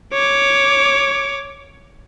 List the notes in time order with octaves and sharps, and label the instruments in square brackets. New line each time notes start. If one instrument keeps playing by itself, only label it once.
[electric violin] C#5 D6